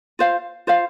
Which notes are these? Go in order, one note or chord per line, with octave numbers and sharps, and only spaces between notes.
F4 C5 F5
F4 C5 F5